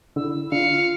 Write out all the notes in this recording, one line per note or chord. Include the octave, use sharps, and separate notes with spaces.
D3 E4 E6
D3 F4 F5 C#7